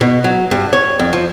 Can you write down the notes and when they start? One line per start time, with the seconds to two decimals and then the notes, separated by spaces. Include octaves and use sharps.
0.01 B2
0.24 F#3
0.51 G2
0.73 C#5
0.99 F2
1.13 F3